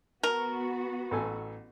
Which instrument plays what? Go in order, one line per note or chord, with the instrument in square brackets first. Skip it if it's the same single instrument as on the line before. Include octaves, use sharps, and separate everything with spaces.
[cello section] B3 F#4 [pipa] A#4
[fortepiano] A1 A4 G#5